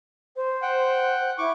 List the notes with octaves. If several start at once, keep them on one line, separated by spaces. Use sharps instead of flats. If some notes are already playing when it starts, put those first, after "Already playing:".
C5
F#5 G5
E4 C#6 D6